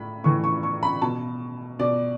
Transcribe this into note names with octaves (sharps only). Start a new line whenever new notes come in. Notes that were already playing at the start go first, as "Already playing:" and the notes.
Already playing: A2 B5
A2 E3 C#6
C#6
C#6
B5
B2 A5
B2 D5